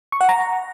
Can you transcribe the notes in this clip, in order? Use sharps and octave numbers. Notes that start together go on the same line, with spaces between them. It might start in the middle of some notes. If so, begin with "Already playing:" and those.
C#6
F#5
A#5